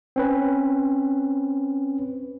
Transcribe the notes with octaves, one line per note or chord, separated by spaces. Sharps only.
C4 C#4 B4